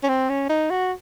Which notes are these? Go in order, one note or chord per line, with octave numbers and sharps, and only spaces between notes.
C#4
C4
C#4
D#4
F#4